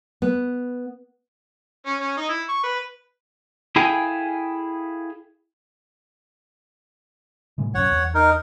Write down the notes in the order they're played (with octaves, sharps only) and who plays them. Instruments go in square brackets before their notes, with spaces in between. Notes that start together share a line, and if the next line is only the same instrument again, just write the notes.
[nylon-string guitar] B3
[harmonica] C#4
C#4
D#4
E4
C#6
B4
[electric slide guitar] E4 G#4 A4 F5 G5 G#5
[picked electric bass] A2 C3 G#3
[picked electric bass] B1 F#2 [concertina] C#5 F#5
[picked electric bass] E2
[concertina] D#4 A#4